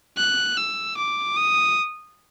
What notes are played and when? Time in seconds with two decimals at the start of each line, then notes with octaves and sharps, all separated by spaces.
0.18 F#6
0.57 E6
0.97 D6
1.37 D#6